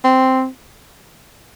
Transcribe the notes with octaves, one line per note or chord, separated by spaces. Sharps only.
C4